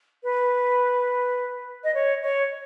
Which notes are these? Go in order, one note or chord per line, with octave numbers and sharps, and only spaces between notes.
B4
D#5
C#5
C#5